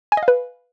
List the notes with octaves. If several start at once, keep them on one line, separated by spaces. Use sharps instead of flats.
G#5
D#5
F5
B4